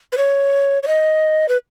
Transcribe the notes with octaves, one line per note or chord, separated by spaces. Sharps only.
B4
C#5
C#5
D#5
B4